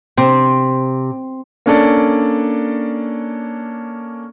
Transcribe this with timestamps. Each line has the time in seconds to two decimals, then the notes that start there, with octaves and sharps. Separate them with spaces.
0.17 C3 C4
1.66 A#3 C#4 D4 A4 D5